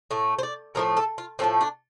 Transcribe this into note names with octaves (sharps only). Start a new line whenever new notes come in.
A2 A3
C5
D5
A2 F3 A3 A#4
A4
F4
A2 F3 A3 C4
D4